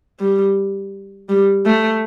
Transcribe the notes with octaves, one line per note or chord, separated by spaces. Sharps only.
G3
G3
A3